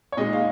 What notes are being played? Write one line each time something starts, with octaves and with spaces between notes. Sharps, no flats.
C#5
A#2 G#3 D#4 D#5
F5